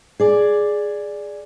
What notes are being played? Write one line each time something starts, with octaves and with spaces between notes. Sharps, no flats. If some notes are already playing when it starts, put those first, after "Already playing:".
G#4 D5